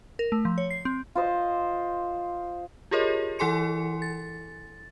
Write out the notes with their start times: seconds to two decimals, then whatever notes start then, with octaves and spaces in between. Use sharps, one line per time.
0.19 A#4
0.32 A3
0.45 F3
0.58 C#5
0.70 C7
0.85 C4
1.15 F4 C5 D#5
2.91 F4 G4 G#4 A#4 C#5 D#5
3.39 E3 E4 A4 G#5 C6 C#7
4.02 A6